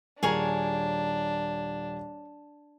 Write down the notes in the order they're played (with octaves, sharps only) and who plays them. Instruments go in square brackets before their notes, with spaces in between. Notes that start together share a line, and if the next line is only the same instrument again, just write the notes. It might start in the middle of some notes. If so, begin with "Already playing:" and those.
[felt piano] D#1 G#5 [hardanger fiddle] D4 [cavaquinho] G#4 A#4 C#5